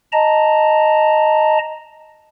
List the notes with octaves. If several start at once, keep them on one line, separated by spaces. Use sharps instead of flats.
D#5 A5 A#5